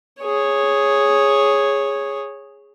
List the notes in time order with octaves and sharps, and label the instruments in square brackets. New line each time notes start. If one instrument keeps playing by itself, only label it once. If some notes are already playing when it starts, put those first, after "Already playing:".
[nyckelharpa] G#4 C#5